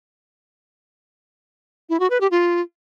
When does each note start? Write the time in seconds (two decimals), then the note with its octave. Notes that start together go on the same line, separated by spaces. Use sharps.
1.89 E4
2.00 F#4
2.10 B4
2.21 G4
2.31 F4